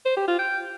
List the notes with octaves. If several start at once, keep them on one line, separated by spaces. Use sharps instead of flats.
C5
G4
F4
G5